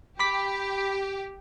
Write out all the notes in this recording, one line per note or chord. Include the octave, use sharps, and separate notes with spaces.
G4 B5 D6 B6